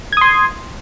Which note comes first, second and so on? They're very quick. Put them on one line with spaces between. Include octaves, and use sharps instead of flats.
G#6 D#6 C6